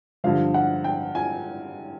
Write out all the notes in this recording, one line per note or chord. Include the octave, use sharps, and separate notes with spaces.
G2 D3 F3 F5
F#5
G5
G#5